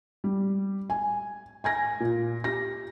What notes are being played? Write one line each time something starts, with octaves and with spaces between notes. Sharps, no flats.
G3
G#5
G#5 G#6 A#6
A#2
G4 A#6